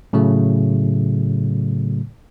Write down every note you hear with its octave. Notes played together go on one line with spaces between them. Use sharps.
A2 C#3 F#3 A3